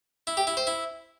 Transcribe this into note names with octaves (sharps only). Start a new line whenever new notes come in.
E4
G4
E4
C5
E4